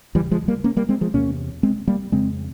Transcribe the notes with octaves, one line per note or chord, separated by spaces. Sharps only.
E2 C#3 E3 G3
F3 G#3
G3 A#3
A#3 C#4
G3 A#3
G#3 C4
F3 G#3
E2 C3 A#3 C#4
G#3 C4
G3 A#3
F2 C#3 G#3 C4